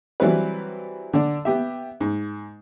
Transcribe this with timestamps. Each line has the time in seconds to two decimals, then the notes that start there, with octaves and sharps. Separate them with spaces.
0.20 E3 F#3 G3 C4 E4 B4
1.13 D3 D4
1.45 B3 G4 E5
2.00 G#2